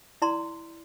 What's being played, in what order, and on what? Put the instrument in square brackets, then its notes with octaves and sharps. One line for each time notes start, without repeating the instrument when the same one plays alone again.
[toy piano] E4 D5 A#5 C6